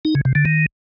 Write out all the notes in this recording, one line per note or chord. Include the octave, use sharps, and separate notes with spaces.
D#4
C#3
C3
D3
D#3